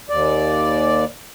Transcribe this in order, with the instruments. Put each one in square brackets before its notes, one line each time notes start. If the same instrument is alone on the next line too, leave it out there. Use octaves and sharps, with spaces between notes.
[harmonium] D#2 D5